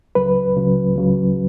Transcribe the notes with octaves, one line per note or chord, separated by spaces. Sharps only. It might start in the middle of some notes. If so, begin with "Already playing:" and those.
C#2 C#3 F#3 B4
C#2 C#3 F#3
C#2 C#3 F#3